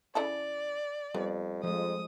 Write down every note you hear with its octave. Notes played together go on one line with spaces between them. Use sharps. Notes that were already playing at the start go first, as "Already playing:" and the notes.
C#3 E4 A4 D5
F2 G3 B3
F2 F3 G#3 D#6